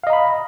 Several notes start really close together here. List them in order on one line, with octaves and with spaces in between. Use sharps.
F5 D#5 A#5 B5